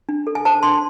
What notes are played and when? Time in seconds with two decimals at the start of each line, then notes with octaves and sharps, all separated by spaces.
0.09 D4
0.27 A4
0.35 G#5
0.45 C5 A5
0.63 D4 C6